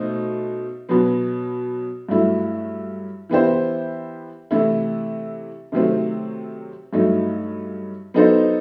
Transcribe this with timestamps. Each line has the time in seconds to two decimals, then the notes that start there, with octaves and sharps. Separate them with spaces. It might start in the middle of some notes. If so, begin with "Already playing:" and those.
Already playing: B2 A3 D#4 C5
0.89 B2 F#3 B3
2.09 G2 F#3 A3 E4
3.30 E3 B3 E4 G4 C5
4.51 C3 E3 A3 E4
5.72 C3 D#3 F#3 A3 C4
6.93 G2 F#3 A3 D#4
8.14 F#3 B3 D#4 A4 C5